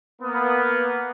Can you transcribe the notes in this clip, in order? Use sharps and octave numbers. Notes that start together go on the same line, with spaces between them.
A#3 B3